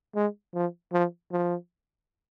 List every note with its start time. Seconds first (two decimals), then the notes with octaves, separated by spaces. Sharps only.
0.15 G#3
0.54 F3
0.93 F3
1.32 F3